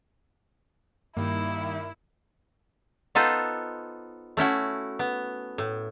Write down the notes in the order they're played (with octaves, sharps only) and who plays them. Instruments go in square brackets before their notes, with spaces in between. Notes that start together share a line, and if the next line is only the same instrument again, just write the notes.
[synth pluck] G2 [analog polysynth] D#3 G3 D#4 [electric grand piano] A#3 [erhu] E4
[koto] B3 D#4 F4 A4 B4 C5
A3 C#4 E4 F#4
B3
A2